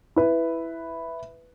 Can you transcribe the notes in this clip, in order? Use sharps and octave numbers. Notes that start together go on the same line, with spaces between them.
E4 B4